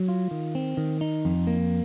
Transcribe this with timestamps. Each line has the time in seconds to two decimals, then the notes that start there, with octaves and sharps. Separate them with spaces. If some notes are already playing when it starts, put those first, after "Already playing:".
Already playing: F#3
0.08 F4
0.31 D#3
0.55 C4
0.77 D#3
1.01 D#4
1.25 F2
1.47 A#3